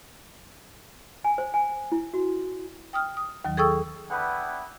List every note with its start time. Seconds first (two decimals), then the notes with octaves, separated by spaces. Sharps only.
1.24 G#5
1.38 C5
1.54 G#5
1.92 E4
2.14 F#4
2.93 G5 D#6 F6
3.17 D#6
3.45 D#2 D#3 F#3
3.57 G#4 A4 G5 C#6 D#6 E6
4.10 B3 D4 E4 B4 F#5 G5